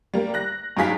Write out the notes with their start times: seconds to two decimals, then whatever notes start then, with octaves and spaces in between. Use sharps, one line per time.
0.14 G3 A#3
0.34 F#6 A#6
0.77 G2 F#3 D#4 G#4 F5 B6